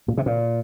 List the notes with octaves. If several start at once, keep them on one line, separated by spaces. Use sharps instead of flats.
A#2
C3
A#2